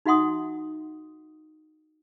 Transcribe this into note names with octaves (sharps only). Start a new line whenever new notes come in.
D#4 F#4 E5 F#5 C6 D#6